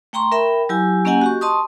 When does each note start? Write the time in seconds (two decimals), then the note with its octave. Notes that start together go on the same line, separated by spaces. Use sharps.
0.13 A3 G5 A#5 C6 C#6
0.32 A#4 E5 G5 B5
0.69 F#3 E4 G4 G#5
1.05 A#3 C#4 G4 D#5 F#5 G#5
1.21 F#4 G4 C#6
1.41 D#5 A5 C6 C#6 D#6